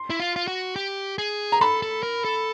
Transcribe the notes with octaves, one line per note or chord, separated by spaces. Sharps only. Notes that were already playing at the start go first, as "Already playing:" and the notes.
Already playing: C6
E4
F4
F4
F#4
G4
G#4
A#5
A4 B5
A4
A#4
A4